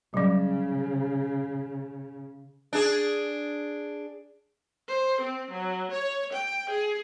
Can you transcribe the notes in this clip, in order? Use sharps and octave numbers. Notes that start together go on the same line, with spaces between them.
C#3 F#3 G3
D4 G#4
C5
C4
F#3
C#5
G5
G#4